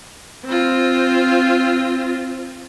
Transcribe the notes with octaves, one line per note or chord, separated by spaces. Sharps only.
C4 F4